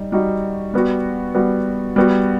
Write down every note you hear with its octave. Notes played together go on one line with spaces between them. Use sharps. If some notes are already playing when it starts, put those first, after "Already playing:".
Already playing: G3 D#4
G3 D#4 F#4
G3 B3 F#4
G3 B3 F#4
G3 B3 F#4